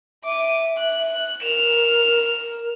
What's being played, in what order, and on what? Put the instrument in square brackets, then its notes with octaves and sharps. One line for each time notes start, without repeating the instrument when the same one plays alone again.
[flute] E5 [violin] D6 D#7
[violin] F#6
[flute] A#4 [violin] E7 F7